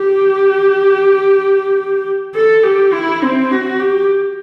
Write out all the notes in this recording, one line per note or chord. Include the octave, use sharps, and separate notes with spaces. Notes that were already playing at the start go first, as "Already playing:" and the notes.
Already playing: G4
A4
G4
E4
C4
F#4
G4